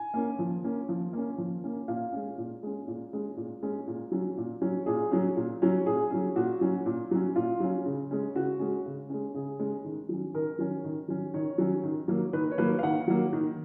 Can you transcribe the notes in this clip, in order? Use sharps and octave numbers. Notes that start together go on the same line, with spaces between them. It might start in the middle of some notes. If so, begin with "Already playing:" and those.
Already playing: G#5
A#3 C#4
F3
A#3 C#4
F3
A#3 C#4
F3
A#3 C#4
A#2 F5
G#3 C#4
A#2
G#3 C#4
A#2
G#3 C#4
A#2
G#3 C#4
A#2
F#3 C#4
A#2
F#3 C#4
A#2 G#4
F#3 C#4
A#2
F#3 C#4
A#2 G#4
F#3 C#4
A#2 F#4
F#3 C#4
A#2
F#3 C#4
A#2 F4
F#3 C#4
C#3
G#3 C#4
C#3 F#4
G#3 C#4
C#3
G#3 C#4
C#3 G#4
G#3 C#4
D#3
F#3 C#4
D#3 A#4
F#3 C#4
D#3
F#3 C#4
D#3 C#5
F#3 C#4
D#3
F#3 A#3
D#3 B4
C#5
F#3 A#3 B4
F5
D#3 F#5
F#3 A#3
D#3